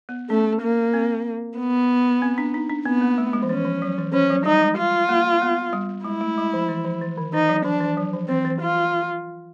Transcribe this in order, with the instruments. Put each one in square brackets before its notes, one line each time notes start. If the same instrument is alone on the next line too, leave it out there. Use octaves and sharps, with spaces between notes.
[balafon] B3
[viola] A3 [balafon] C#4
[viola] A#3
[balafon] C4
[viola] B3
[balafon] C4
D4
D#4
D4
[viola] B3 [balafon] C4
[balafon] A#3
A3
G#3
F3
[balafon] E3 [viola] C#4
[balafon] F3
F#3
E3
[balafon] F3 [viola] C#4
[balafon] F#3
[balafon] G3 [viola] D#4
[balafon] G#3
[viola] F4
[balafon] A#3
B3
G3
[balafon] G#3 [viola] E4
[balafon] A3
G#3
F3
E3
F3
E3
D#3
[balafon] E3 [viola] D#4
[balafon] F#3
[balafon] F3 [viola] D4
[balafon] E3
F#3
F3
[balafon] E3 [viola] C4
[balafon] E3
[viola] F4